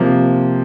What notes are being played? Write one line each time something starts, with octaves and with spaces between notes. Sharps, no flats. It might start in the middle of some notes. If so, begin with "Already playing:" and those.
Already playing: C3 F3 A#3